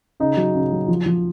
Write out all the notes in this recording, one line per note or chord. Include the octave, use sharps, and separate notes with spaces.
C#3 D#4
F#3
C#3
F#3
F3
F3